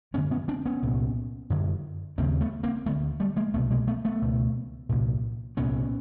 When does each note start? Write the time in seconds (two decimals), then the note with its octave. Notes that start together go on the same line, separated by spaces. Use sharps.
0.14 F#2 B3 C#4
0.18 D3
0.31 B3 C#4
0.48 C4 D4
0.66 B3 C#4
0.82 C2 A#2
1.50 F#2 D3
2.18 D#2 C#3 A#3 C4
2.41 A3 B3
2.63 A#3 C4
2.86 D2 D3 A3 B3
3.20 G3 A3
3.37 G#3 A#3
3.53 C2 B2 A3 B3
3.71 G#3 A#3
3.88 A3 B3
4.05 A3 B3
4.22 C#2 B2
4.89 C2 A#2
5.57 C2 A#2 B3 C#4